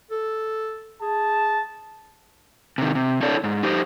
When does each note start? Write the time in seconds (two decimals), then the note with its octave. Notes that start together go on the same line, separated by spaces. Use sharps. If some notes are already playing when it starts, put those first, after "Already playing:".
0.11 A4
1.02 G#4 A5
2.78 C3 D#3
2.95 C3
3.23 D4 E4 A4 C#5 D5
3.44 G#2
3.63 D#4 G4 C5